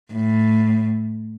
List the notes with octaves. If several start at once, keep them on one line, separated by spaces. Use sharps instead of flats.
A2